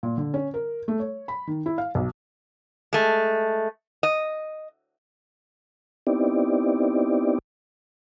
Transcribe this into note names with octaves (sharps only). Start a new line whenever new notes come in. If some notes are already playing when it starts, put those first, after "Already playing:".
A#2
D3
C#4
A#4
A3
C#5
B5
D#3
E4
F5
B1
G#3 A3
D#5
B3 C4 D#4 E4 G4 D5